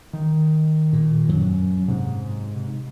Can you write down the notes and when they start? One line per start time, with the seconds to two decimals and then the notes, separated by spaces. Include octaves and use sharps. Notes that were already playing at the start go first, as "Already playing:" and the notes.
0.13 D#3
0.93 A#2
1.29 F#2 F#3
1.88 G#2 C3